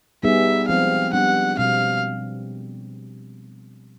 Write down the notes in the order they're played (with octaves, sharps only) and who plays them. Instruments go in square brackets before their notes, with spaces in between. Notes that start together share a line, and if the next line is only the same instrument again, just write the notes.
[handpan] G3 B3 D#4 G#4 [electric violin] E5
[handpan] F3 G#3 C4 [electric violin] F5
[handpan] G3 B3 D4 [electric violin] F#5
[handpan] B2 G3 C4 [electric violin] F5